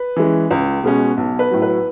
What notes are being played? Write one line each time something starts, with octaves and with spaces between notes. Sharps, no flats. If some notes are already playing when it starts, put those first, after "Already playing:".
Already playing: B4
E3 G#3 C#4
C#2
B2 G#3 C#4
B1
B4
A2 F#3
B4